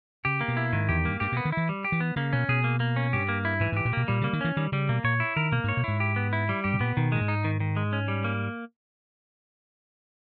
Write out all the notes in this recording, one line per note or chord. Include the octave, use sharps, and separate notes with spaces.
C#3 G4
A#3
B2
E4
G#2 D#3
E2 G4
G2 A#3
G2 G4
B2 B3
D#3
E3 E4
G3
G4
E3
B3
C#3 A#3
B2 C#4
B2 G#4
A#3
A#3
C#4
G2 G4
A#3
E4
G#2 E3
G#2 G4
A#2
B2 A#3
A#2 G3
C#3 A#3
D#3
E3 C#4
D#3 G3
C#3 G3
B2 A#3
A#2 C#5
E4
D#3 A#4
B2 A#3
G#2 C#5
B2
G#2 E4
G4
B3
E4
G3
G2 G4
B2
A#2 B3
B2 D#3
A#2 G#3
G#2
D#4
D#3
D#3
G#3
C#4
G3
A#3